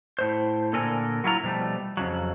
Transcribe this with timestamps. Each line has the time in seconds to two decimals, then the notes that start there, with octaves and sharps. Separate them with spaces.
0.19 A2 C5
0.73 A#2 D3 A4 A#4 G#5
1.24 F#3 E4 F4 A#5
1.43 B2 F3 G3 A3
1.97 F2 C#3 F#3